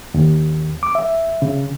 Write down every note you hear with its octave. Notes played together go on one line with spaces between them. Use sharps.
D#2
D6
E5
C#3